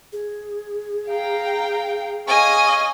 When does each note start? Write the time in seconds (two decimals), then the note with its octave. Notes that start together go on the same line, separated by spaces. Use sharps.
0.13 G#4
1.09 F5 G5 A#5
2.28 C#4 D#5 F5 G#5